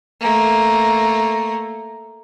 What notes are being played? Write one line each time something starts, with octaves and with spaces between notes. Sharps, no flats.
A3 A#3